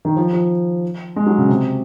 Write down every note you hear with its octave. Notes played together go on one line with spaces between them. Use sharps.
D#3
F3
F3
G#3
F#3
C#3
C3